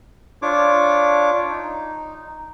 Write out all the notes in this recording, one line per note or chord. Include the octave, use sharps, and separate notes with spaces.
D4 F4 C#5 D6
D#4